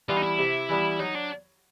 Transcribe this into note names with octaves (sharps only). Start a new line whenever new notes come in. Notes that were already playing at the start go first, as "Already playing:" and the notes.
E3 G3 B3 F4
D#4
E4
C3
E3 G3 B3
F#3 D#4
D4